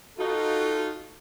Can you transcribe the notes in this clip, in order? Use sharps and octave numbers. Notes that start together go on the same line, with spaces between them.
D#4 F4 F#4 A4